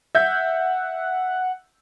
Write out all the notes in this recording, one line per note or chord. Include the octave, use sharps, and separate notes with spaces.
E5 F#5 G6